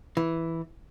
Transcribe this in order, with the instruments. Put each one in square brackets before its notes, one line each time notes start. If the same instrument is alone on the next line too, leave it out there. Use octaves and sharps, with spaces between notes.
[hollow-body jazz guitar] E3